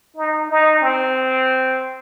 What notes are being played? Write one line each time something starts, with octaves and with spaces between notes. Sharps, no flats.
D#4
D#4
C4